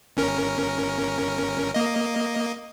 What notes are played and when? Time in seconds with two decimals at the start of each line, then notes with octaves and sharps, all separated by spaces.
0.17 G1 C#4 A#4
1.74 A#3 D#5